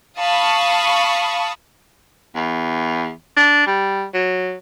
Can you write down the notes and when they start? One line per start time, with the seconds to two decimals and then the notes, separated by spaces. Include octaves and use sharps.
0.18 F5 A5 B5 C#6 D#6
2.36 E2
3.37 D4
3.67 G3
4.14 F#3